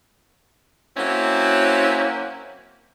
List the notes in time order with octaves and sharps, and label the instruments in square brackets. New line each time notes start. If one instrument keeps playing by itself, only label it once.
[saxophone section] F#3 A#3 C4 C#4 E4